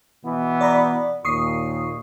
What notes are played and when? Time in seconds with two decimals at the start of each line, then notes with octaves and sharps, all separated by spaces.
0.24 B2 E3 B3
0.61 D5 A#5 B5
1.25 D#2 A#2 C#6 D#6 C7